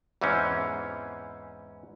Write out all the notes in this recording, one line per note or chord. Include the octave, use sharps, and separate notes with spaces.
E2 G#2 E3 C4 C#4